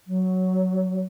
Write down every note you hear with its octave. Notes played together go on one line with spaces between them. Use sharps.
F#3